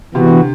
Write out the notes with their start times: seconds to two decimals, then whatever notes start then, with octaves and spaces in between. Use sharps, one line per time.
0.14 C3 E3 B3 F#4
0.28 D3